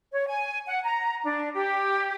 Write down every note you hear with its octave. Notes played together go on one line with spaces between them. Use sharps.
C#5
G#5
F#5
A#5
D4
G4